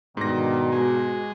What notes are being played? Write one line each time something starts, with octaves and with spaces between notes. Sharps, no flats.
G#2 B2 D3 D#3 A#6
G#3 F#4